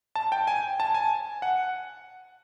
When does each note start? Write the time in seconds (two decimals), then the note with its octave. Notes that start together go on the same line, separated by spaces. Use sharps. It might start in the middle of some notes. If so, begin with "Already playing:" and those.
0.15 A5
0.32 G5
0.47 G#5
0.80 A5
0.94 G#5
1.42 F#5